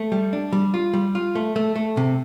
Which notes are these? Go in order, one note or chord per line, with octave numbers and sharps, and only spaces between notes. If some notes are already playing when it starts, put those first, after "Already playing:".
Already playing: A3
G3
D4
G3
F4
G3
F4
A3
A3
A3
C3